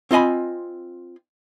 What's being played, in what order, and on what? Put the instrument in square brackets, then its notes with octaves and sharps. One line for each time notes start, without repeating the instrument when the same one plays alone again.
[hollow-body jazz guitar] C4 F4 D#5 G#5 B5